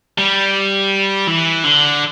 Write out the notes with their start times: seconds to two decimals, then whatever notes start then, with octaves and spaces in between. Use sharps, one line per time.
0.18 G3
1.28 E3
1.64 D3